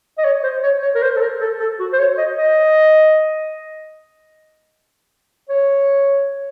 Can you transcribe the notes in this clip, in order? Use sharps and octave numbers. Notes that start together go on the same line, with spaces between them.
D#5
C#5
C5
C#5
C#5
A#4
C5
A4
A#4
A4
A4
F#4
C5
C#5
D#5
D#5
C#5